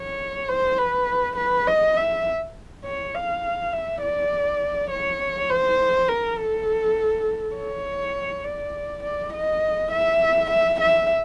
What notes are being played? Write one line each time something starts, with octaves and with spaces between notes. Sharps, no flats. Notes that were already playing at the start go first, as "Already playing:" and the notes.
Already playing: C#5
C5
B4
B4
D#5
E5
C#5
F5
E5
D5
C#5
C5
A#4
A4
C#5
D5
D5
D#5
E5
E5
E5